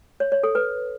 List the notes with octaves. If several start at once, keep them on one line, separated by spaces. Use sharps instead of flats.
C#5
C#5
A4
B4